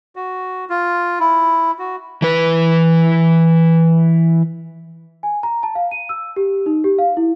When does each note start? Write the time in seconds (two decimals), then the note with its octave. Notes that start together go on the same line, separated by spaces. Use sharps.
0.16 F#4
0.70 F4
1.20 E4
1.79 F#4
2.22 E3 B4
5.23 G#5
5.43 A#5
5.63 A5
5.75 F5
5.91 D#7
6.09 E6
6.36 G4
6.66 D#4
6.84 G4
6.99 F5
7.17 E4